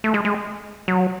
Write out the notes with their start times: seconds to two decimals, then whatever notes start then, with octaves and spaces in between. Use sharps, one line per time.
0.04 A3
0.14 G#3
0.25 G#3
0.88 F#3